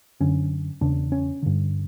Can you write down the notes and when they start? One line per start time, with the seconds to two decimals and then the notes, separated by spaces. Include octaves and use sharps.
0.20 F#2 D3 C#4
0.81 E2 C#3 D4
1.12 C#4
1.42 G2 D3